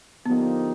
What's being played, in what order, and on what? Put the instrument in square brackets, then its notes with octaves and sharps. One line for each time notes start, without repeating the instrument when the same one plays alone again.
[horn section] D3 F3 A#3 D#4 G4 [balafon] B3